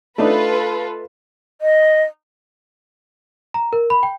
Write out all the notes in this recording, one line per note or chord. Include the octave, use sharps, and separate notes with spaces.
A3 D4 D#4 F4 A4 B4
D#5
A#5
A#4
B5
G5